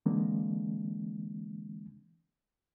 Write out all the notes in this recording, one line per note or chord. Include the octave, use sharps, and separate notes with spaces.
D3 E3 G#3 A#3 C4 D4